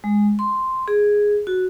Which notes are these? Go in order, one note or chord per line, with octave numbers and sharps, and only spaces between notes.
G#3
C6
G#4
F#4